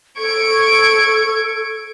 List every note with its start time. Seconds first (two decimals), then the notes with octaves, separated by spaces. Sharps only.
0.18 A4 C#6 G#6 D7